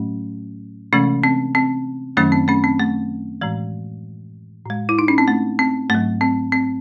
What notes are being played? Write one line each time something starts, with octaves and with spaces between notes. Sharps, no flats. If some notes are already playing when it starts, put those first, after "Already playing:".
Already playing: A2 F#3 A3 C#4
C3 E3 G#3 A3 C#4
C4
C4
F#2 D#3 F#3 A3 C#4
C4
A3 C#4
C4
A3
A2 E3 G#3
A2 G#3
E4
D#4
C#4
C4
A3
C4
G#2 F#3 A3
C4
C4